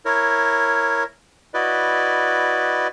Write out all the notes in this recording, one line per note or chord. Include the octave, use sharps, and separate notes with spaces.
E4 A#4 C#5
E4 F#4 B4 D5 D#5